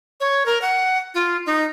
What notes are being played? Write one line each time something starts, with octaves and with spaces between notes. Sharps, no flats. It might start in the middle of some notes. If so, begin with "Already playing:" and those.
C#5
A#4
F#5
F4
D#4